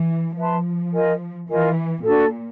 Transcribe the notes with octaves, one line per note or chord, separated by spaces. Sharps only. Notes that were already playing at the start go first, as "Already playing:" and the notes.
Already playing: E3
F3 B4 E5 A5 C6
F4 A#4 D#5 G#5
E3 F4 A#4 D#5 G#5
A#2 D4 F#4 A4